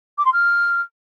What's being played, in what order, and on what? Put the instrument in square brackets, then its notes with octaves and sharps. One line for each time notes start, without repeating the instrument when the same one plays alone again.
[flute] D6
C6
F6